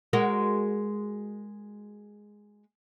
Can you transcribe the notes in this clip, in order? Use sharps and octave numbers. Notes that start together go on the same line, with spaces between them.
G#3 F#4 A#4